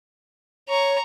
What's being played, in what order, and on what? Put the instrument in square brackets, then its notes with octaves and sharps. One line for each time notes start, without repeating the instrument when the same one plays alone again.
[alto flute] C#5 [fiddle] A#5 C#6